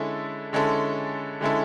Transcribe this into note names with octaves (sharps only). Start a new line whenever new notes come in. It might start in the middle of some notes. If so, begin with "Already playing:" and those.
Already playing: D3 G#3 C#4 E4 A4
D3 G#3 C#4 E4 A4
D3 G#3 C#4 E4 A4